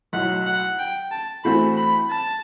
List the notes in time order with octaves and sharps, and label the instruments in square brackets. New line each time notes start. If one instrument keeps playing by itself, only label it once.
[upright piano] B1 A2 F#3 [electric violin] F#5
[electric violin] F#5
G5
A5
[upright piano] A2 E3 A3 C4 F#4 [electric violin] B5
[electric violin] B5
A5